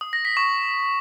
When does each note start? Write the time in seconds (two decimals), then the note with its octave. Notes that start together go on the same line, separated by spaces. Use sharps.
0.01 D#6
0.13 A#6
0.25 B6
0.37 C#6